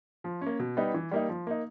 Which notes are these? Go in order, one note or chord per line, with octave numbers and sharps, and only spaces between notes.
F3
A#3 C#4
B2
G3 B3 D#4
E3
G3 A#3 D#4
F3
A#3 D#4